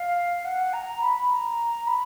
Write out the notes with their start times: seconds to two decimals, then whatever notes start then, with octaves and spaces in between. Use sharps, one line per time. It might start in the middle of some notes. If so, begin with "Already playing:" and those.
Already playing: F5
0.45 F#5
0.73 A#5
1.01 B5
1.30 A#5
1.87 B5